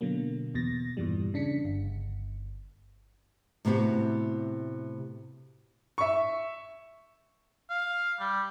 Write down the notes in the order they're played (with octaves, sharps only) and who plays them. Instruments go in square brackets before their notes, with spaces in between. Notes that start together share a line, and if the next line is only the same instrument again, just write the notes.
[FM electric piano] B2 D3 F#3 A#3
E2 B2 A6 A#6
E2 G2 A#2 E3 G3
C#3 D4 B6 C#7
G1
[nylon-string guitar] A2 C3 B3 F#4 G4
[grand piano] E5 C#6
[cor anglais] F5
G3